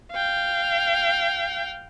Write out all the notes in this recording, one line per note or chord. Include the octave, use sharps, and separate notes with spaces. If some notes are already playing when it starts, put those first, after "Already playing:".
F5 G5